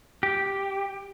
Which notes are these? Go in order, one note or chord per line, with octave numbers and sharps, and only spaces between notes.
G4